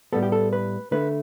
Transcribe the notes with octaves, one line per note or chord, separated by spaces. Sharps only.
A2 G3 B3 A4
G4
A4
B4
D3 A3 B4